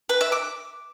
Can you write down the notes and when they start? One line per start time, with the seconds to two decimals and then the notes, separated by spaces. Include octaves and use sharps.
0.09 B4
0.21 E5
0.32 D6